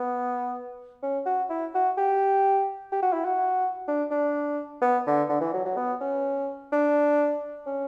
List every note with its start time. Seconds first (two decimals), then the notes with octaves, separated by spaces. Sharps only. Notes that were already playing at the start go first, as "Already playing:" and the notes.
Already playing: B3
1.03 C#4
1.26 F#4
1.50 E4
1.75 F#4
1.98 G4
2.92 G4
3.02 F#4
3.13 E4
3.25 F#4
3.88 D4
4.11 D4
4.81 B3
5.06 D3
5.29 D3
5.41 E3
5.54 F#3
5.65 F#3
5.77 B3
6.01 C#4
6.72 D4
7.67 C#4